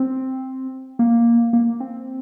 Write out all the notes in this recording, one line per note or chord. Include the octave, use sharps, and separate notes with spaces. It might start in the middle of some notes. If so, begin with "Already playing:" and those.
Already playing: C4
A#3
A#3
C4